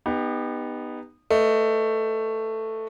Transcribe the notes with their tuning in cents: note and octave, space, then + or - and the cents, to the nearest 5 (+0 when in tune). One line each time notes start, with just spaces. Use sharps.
B3 +0 D#4 -15 G4 +25
A3 +10 B4 +0 D#5 +0